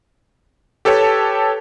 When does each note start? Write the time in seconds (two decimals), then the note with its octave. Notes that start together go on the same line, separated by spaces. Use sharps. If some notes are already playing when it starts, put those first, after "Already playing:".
0.85 G4 A4 B4 C#5 G5 A5